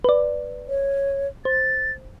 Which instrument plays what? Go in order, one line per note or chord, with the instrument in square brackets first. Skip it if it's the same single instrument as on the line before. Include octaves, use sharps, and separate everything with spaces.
[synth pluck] B4 D5
[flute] C#5
[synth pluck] C5 [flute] A6